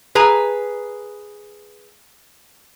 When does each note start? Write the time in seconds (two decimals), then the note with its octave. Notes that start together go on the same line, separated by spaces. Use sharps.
0.15 G#4 B4 A#5